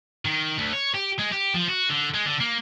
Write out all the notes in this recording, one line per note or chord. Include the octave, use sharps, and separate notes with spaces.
D#3
D2
C#5
G4
G#3
G4
F3
F#4
D3
G#3
D3
A#3